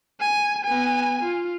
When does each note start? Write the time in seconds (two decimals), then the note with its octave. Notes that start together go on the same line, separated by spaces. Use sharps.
0.21 G#5
0.64 B3 G#5
1.23 F4